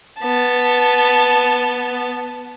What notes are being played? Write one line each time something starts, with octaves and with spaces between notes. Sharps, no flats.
B3 A5